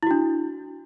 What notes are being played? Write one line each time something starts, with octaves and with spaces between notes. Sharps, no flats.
D4 E4 F#4